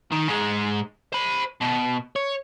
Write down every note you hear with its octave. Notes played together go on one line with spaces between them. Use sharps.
D#3
G#2 G#3
C5 B5
B2
C#5